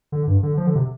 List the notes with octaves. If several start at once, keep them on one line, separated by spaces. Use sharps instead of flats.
D3
G2
D3
F3
D3
C3